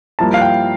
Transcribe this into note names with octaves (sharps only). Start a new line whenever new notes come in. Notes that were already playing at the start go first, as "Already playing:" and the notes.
G2 F3 A#3 E4 A5
F5
G5